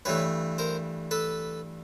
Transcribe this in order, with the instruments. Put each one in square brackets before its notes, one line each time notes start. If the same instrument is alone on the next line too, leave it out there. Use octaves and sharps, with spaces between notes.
[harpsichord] G2 E3 A3 B4 C#5
A#4 C5
A4 B4